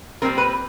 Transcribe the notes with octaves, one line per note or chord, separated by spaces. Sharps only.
A#2 G3 C4 A#4
B4